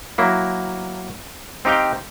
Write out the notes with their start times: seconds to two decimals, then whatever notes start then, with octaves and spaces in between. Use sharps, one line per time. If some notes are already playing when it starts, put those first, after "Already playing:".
0.18 F#3 A#3 E4
1.65 C4 D#4 G4 F5 G5